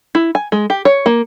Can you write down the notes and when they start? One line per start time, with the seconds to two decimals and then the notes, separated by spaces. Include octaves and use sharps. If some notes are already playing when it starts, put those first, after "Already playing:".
0.15 E4
0.35 G#5
0.52 G#3
0.70 G4
0.85 C#5
1.06 A#3